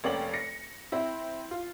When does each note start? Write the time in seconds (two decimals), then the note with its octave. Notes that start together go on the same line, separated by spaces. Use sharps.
0.04 F1 A#3 C#4 D5 G5 F#7
0.34 A#6 C#7
0.92 C4 E4
1.51 F4